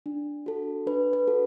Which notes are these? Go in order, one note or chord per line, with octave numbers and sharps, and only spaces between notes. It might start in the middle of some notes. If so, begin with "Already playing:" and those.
D4
F#4 A4
D4 B4
B4
F#4 A4